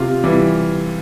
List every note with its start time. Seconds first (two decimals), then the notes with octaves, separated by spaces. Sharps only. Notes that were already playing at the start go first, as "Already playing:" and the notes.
Already playing: C3 F4
0.23 E3 G3